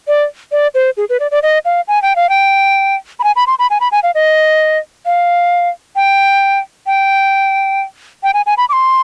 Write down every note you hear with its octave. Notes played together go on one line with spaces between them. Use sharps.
D5
D5
C5
G#4
B4
D5
D5
D#5
F5
G#5
G5
F5
G5
B5
G#5
B5
C6
B5
G#5
B5
G#5
F5
D#5
F5
G5
G5
G5
G#5
G#5
B5
D6
C6